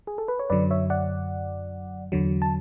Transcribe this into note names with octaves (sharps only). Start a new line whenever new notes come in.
G#4
A4
B4
C#5
F#2 D3 F#3 B4 D5
C#5 E5
D5 F#5
E2 D3 F#3
A5